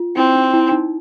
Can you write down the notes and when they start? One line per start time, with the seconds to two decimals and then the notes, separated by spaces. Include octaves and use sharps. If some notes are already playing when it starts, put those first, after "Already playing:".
Already playing: F4
0.16 C4 E4
0.35 D#4
0.54 E4
0.72 D#4